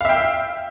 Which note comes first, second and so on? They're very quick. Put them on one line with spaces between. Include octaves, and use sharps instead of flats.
F5 E5 G5